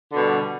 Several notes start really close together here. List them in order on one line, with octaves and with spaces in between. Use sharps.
D3 B2 G3